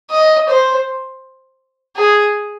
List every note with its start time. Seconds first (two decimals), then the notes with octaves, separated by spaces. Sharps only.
0.11 D#5
0.48 C5
1.96 G#4